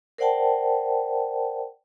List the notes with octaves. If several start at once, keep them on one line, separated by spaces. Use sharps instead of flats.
A#4 C5 D5 F#5 G5 A5